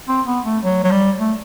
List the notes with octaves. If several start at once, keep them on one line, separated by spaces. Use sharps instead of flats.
C4
B3
A3
F#3
F#3
G3
A3